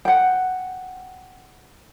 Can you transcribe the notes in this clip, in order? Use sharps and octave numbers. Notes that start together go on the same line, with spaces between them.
F#5 G5